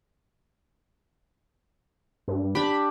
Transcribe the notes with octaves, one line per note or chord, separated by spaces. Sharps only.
G2
D4 G4 B5